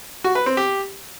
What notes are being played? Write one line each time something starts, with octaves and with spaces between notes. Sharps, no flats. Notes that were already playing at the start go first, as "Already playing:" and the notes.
F#4
B4
C4
G4